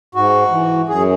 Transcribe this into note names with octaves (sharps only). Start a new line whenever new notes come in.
G#2 F#4
E3
F#2 G#4